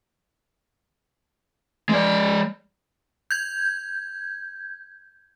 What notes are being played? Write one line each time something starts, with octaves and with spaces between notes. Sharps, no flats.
G#3 D5
G6 G#6